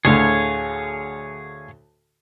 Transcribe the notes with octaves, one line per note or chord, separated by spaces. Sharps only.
D2 A2 D3 G#4 C#5 F5